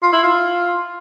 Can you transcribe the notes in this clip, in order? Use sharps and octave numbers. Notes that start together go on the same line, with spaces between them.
F4
E4
F4